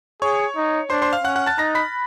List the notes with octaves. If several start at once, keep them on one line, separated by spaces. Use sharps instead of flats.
G#4 C#5 C#6
D#4
D4 C5 C6
C5 C6
F5 F6
C#4 F#5 F#6
F#5 F#6
A5 A6
D#4 A#5 A#6
B5 B6